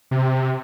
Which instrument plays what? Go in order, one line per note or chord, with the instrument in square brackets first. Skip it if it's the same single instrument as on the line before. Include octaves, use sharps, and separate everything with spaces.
[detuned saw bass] C3